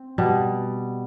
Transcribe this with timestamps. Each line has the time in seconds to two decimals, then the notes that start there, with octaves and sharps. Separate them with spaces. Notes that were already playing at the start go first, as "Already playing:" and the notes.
Already playing: C4
0.18 B2 G3